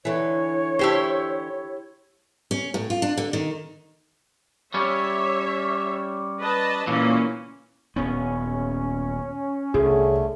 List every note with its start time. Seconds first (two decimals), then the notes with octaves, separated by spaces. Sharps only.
0.05 D3 E3 C#5
0.79 E4 G4 C5
2.51 C#4
2.74 A2
2.90 F4
3.02 D4
3.17 D3
3.33 D#3
4.74 G3 C#4 C#5 E5
6.40 B4 D#5 A5
6.87 C#2 A#2 E3 A#3 C#4
7.96 D#1 B3 C#4
9.74 C2 D3 A3 G#4